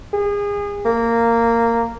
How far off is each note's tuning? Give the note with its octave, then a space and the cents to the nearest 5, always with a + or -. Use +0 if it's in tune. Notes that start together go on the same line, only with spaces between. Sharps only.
G#4 -30
A#3 -10